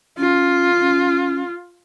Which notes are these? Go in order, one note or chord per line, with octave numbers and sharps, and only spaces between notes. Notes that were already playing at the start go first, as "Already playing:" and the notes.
C#4 F4
C#4